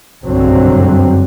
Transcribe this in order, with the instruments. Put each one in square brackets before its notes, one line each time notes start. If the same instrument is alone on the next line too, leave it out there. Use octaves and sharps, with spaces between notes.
[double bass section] F#1 B1 G2 D3 F#3 C4